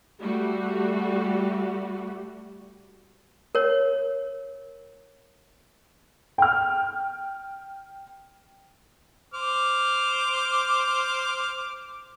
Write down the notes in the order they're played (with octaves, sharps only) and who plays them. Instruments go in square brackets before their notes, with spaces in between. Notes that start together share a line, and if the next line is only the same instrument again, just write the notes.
[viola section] G3 A3 F#4
[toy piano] A#4 C#5
[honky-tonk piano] G5 F6
[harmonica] C5 D6 F6